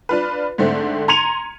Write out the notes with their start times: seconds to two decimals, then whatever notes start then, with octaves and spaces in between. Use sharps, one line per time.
0.09 D4 F4 B4
0.58 G#2 D3 A3 C4
1.08 A#5 C6 G#6 C#7 D#7 F7